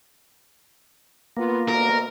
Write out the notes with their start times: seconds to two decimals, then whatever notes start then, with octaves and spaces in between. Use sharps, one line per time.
1.37 A#3 B3 F4
1.68 D2 B2 A#4